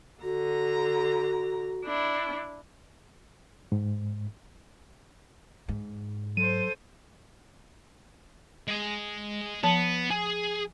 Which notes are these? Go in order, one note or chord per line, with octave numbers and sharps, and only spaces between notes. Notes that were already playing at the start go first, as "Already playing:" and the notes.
D3 F#4 A#5
D4 E4
G#2
G#2
F#3 A4 C5 D#7
G#3 G#5
F3 B3 A5
G#4 G#5